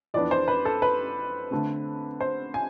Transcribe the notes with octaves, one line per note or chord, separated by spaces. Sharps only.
F2 E3 B3 D4 D5
C5
B4
A4
B4
D3 A3 C4
C5
G#5